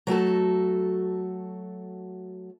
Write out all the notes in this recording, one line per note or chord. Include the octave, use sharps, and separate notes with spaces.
F#3 A3 F#4 A4